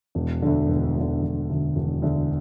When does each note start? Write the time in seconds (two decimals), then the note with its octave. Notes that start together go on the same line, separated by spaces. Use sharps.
0.15 E1
0.42 D2 D3
0.68 E1
0.96 D2 D3
1.23 E1
1.49 D2 D3
1.76 E1
2.02 D2 D3